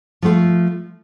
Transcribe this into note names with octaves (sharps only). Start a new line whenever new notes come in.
F3 A3 F4